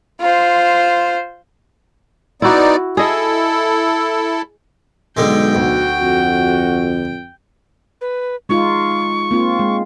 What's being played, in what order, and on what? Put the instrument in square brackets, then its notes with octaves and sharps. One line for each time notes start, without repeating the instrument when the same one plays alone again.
[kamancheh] F4 C5
[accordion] B3 D#4 D5 [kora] E4 F#4
[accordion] E4 A4 [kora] G#4 D#5
[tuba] B1 [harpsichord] G#2 D3 G#3 [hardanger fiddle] G5
[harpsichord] D2 [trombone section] F#4
[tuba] F2
[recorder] B4
[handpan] G#3 D#4 F4 [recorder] C#6
[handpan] A#3 C4 F4
G#3